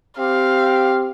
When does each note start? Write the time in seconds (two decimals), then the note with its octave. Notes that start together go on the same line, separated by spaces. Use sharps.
0.19 C4 G4 F5